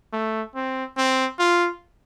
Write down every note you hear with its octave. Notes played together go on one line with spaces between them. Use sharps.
A3
C4
C4
F4